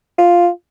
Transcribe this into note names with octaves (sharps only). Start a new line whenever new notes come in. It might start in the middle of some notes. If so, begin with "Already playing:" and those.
F4